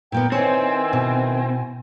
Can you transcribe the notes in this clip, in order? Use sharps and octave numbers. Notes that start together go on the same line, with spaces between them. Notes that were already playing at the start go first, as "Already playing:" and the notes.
A#2 A#3 B3 G5
D#3 E3 C4 C#5 G#5
B2